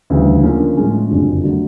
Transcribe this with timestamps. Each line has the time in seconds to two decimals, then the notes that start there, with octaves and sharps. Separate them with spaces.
0.10 D2 C#3 E3 G3
0.43 D3 F3 A#3 C#4 F4
0.77 A2 F3 G#3 C#4
1.11 F#1 F2 D3 F#3
1.44 D3 F#3 A3